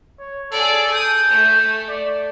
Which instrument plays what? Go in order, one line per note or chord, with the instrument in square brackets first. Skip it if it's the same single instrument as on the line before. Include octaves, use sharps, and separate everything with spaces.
[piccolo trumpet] C#5
[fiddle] G#4 D5 [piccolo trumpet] A4
[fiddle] D#6 [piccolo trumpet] G6
[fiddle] A3
[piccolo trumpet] D5